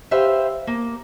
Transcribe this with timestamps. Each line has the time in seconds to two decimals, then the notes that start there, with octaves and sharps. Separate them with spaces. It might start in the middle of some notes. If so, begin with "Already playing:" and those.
0.11 G4 B4 C5 E5 F5 G5
0.67 A#3